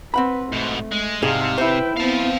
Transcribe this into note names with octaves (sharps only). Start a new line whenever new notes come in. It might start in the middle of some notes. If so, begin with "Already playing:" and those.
C4 B4 F#5 B5
G#2 B2 A3
G#3
C2 G#2 C3 G#4 F5 A5
E4 B4 C5 G5
B3 C4 F5 A5